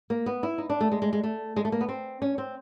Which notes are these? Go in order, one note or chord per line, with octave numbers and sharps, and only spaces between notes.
A#3
B3
E4
D#4
D4
A3
G#3
G#3
G#3
A3
G#3
A3
A#3
B3
C4
C#4
C4